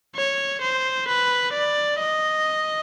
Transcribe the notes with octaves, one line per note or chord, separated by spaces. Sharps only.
C#5
C5
B4
D5
D#5